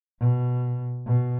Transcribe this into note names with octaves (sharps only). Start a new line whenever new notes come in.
B2
B2